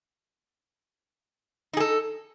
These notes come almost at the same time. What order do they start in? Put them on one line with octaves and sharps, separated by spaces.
D#4 G#4 A4